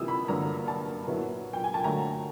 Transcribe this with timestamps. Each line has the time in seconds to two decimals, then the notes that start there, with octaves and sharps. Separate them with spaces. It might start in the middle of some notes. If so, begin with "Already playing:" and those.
Already playing: C3 E3 G3 A#3 D#6 E6
0.08 B5
0.28 G2 D3 F#3 A#3 A#5
0.68 A5
1.07 A#2 F#3 B3 E4
1.53 G5
1.64 G#5
1.74 A5
1.84 D3 F#3 A3 A#5